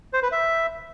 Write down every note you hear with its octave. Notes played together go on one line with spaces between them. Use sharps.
C5
B4
E5